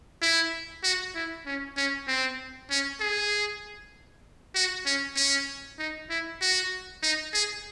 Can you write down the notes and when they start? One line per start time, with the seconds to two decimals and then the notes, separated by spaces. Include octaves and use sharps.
0.22 E4
0.83 F#4
1.14 E4
1.46 C#4
1.77 C#4
2.07 C4
2.70 C#4
3.00 G#4
4.55 F#4
4.86 C#4
5.16 C#4
5.78 D#4
6.10 E4
6.41 F#4
7.03 D#4
7.33 G#4